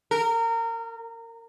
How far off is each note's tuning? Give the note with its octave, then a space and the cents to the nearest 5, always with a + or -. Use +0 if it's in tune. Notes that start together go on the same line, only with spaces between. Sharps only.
A#4 -25